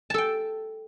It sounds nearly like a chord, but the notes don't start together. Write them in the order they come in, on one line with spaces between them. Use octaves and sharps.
A5 A4 G5